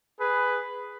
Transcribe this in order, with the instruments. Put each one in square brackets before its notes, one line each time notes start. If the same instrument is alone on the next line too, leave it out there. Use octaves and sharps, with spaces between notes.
[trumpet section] G#4 B4